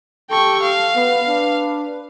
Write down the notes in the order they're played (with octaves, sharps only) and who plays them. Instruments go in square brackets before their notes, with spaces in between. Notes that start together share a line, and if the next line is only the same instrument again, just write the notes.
[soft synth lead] G4 [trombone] A4 [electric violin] G5 C#6
[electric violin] F5
[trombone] B3 [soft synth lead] B4
[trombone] D4